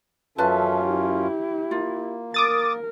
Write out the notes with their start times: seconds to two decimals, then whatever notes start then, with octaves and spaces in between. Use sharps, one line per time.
0.38 F#2 C#4 F4 A4 B4 E5 A5
0.88 E4 G4
1.71 A#3 F4
2.34 A#4 D6 D#6 A6